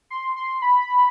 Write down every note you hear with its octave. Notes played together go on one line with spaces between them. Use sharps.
C6
C6
B5